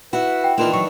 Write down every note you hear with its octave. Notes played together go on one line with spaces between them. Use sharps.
E4 F#4 B4
G5
D#3 E3 A#3 D4 F4
F#3 C#6